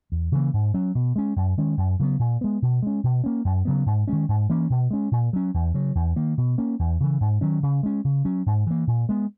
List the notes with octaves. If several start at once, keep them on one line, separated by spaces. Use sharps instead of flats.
E2
C#3 E3 A#3
G#2
F#3 C#4
B2
G#3 C#4
F#2
D#3 G#3 C#4
F#2
C#3 F#3 B3
A#2
G#3 B3
B2
G#3 C#4
B2
A#3 C#4
F#2
C#3 F#3 B3
G#2
D#3 G#3 C#4
G#2
E3 A#3 C#4
B2
G#3 C#4
A#2
F#3 C#4
E2
C#3 F#3
E2
D#3 A#3
B2
A#3 C#4
E2
C#3 E3
G#2
D#3 F#3 C#4
C#3
G#3 C#4
C#3
F#3 C#4
G#2
E3 A#3
A#2
G#3 B3